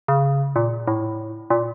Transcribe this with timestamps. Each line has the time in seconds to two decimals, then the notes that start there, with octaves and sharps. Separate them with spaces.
0.08 C#3
0.56 A#2
0.87 A2
1.50 A#2